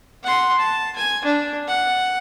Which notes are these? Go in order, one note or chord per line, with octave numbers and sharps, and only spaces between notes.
F#5 C6
A5
G#5
D4
F#5